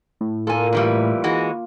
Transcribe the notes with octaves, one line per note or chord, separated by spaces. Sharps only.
A2
A#3 F4 A4 D5 G#5
G2 E3 G3
E3 G#3 F#4